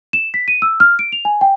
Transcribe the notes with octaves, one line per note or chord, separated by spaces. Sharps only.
E7
B6
D#7
E6
F6
D7
F7
G#5
G5